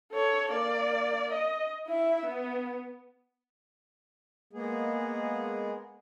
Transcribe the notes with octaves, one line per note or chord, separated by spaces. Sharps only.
A4 C#5
A#3 D5
D#5
E4 E5
B3
G#3 A#3 B3 G#4